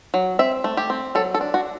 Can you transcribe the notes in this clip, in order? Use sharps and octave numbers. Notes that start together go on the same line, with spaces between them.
F#3
C4 E5
A3
G4
C4
F#3 A4
A4
D4
F#4